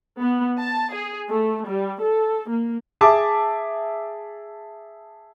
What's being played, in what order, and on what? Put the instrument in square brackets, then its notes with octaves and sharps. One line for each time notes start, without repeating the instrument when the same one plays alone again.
[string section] B3
A5
G#4
A3
G3
A4
A#3
[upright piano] G#4 E5 A5 D6